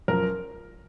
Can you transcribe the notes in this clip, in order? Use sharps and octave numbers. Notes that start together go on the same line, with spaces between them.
F#2 F3 A#4